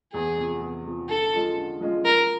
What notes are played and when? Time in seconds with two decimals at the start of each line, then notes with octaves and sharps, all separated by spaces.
0.14 E2 G#4
0.37 C3 F3
0.61 E2
0.85 C3 F3
1.09 D3 A4
1.32 F3 G#3 C#4 F4
1.57 D3
1.80 F3 G#3 C#4 F4
2.04 F3 A#4